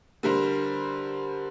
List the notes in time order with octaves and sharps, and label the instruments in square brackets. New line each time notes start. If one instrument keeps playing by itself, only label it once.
[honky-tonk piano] D3 G3 A#4 C5